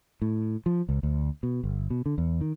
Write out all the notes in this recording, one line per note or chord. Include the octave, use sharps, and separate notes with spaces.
A2
F3
C#2
D2
B2
G1
B2
D3
E2
D#3